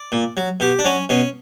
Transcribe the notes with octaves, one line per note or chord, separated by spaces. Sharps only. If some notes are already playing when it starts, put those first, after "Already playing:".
Already playing: D5
A#2
F#3
B2 G4
D4
F#3 C#4
B2 C#4